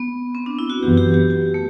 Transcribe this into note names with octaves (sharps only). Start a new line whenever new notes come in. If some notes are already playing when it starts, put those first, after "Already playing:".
Already playing: B3
C4
D4
E4
F#4
F#2 E3 B3 G4
G4
G4
G4
A3